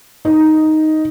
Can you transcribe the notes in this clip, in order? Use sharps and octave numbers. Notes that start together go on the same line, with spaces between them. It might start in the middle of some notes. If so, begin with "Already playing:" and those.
D#4